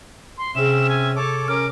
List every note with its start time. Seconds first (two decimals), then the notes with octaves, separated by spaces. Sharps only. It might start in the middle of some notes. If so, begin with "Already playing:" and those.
0.38 C6
0.55 C3 C4 C#4 G#4 E5 E7
0.89 G#5
1.16 A4 C#5 A5 D6
1.48 C#4 A#4 D6 F6